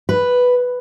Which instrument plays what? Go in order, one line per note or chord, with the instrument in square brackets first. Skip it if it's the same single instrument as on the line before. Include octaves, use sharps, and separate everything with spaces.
[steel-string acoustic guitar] B4